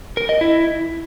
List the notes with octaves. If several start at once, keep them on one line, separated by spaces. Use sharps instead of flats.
A#4
D#5
E4